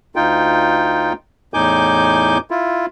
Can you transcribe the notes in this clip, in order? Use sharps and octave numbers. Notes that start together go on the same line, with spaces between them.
D2 D#4 F4 G5
E2 A2 D#4 G#5 D6 G6
E4 F4